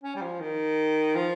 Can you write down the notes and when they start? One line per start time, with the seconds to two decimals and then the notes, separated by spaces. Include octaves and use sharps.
0.03 C#4
0.16 G3
0.22 F3
0.40 D#3
1.15 F3